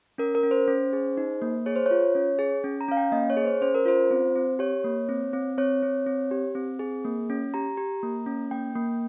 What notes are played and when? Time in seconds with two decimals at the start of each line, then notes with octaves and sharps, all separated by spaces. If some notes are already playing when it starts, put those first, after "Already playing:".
0.18 C#4 A#4
0.35 A#4
0.43 C#4
0.51 C5
0.68 C#4
0.93 G#4
1.17 D#4
1.42 A#3
1.66 G#4 C#5
1.76 C5
1.86 F4 C#5
2.15 C#4
2.39 G#4
2.64 C#4
2.81 A#5
2.88 C#4 F5
2.97 G5
3.12 A#3 D#5
3.30 C#5
3.37 G#4
3.45 C5
3.61 C#4 C5
3.75 A#4
3.86 F4 C5
4.11 C4
4.36 C4
4.59 G4 C#5
4.84 A#3
5.09 C4
5.33 C4
5.58 C4 C#5
5.83 C4
6.07 C4
6.31 G4
6.55 C4
6.79 G#4
7.05 A#3
7.30 C#4
7.54 G4 A#5
7.77 G4
8.03 A#3
8.26 C#4
8.51 A#3 G5
8.75 A#3